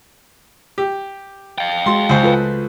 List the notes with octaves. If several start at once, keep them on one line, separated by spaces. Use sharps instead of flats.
G4
F5 G5
G#3 F#4 C6
C#2 C5
F4 A4 B4